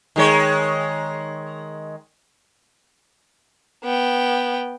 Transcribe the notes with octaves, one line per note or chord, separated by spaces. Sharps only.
D#3 G#3 C#5
B3 G5